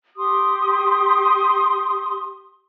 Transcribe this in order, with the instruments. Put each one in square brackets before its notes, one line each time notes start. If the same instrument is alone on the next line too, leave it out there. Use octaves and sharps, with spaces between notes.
[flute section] G4 C6 D6 D#6